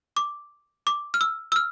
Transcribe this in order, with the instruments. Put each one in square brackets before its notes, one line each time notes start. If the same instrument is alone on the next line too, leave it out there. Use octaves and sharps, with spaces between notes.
[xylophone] D6
D6
F6
E6
E6
F6